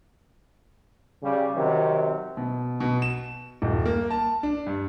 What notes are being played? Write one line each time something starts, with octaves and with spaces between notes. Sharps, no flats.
C#3 G3
C3 D#3 F#3 C4
B2
B2
E7
D#1
A#3
A5
D4
G2